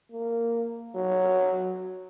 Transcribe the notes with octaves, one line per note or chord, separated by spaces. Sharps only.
A#3
F#3